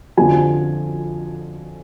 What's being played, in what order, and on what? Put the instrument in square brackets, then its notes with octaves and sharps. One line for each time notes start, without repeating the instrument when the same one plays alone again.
[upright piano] F2 D3 F3 G#5